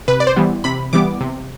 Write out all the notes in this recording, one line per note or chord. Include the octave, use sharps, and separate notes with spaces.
C3 B4
D5
C5
E3 G3 B3
C3 B5
E3 G3 B3 D6
C3